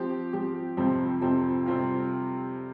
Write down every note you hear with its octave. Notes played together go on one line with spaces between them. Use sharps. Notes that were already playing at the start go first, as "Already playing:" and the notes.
Already playing: F3 C4 G4
F3 C4 G4
F2 C3 F3 C4
F2 C3 F3 C4
C3 G3 C4 F4